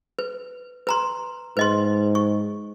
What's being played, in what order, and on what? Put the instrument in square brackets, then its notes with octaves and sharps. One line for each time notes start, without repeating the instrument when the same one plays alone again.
[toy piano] B4
B4 A#5 C6
[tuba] G#2 [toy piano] B4 D#5 C6
[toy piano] C#6